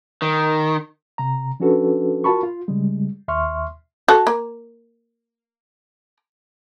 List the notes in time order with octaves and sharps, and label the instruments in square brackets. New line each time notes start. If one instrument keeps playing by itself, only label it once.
[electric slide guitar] D#3
[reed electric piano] C3 A#5
F3 C#4 D4 F#4 A4 B4
F4 F#4 A#4 A5 B5 C#6
F4
C#3 G3 G#3
D#2 E5 C6 C#6 F6
[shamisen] F#4 A4
A#3